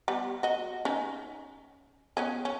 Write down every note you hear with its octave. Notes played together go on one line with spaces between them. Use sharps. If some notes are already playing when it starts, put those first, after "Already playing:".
G3 B3
F#4 D#5
C#4 D#4
B3 C#4 G#4
C#4